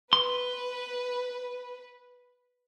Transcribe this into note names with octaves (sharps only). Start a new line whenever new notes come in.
B4 C6